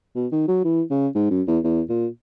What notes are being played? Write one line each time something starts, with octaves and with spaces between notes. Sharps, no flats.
B2
D#3
F#3
E3
C#3
G#2
F#2
E2
E2
A#2